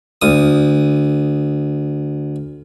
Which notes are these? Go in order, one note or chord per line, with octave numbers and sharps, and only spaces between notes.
D2 D#6